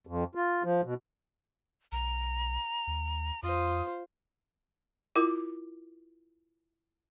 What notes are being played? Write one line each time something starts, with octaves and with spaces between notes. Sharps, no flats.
F2
F4
F3
B2
B1 A#5
D#2
F2 F4 C5 D#6
E4 F4 A#4 D6